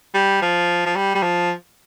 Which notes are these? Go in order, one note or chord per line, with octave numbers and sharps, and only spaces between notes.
G3
F3
F3
G3
G3
F3